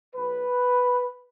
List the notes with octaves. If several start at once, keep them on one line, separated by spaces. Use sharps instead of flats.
B1 B2 F#3 B4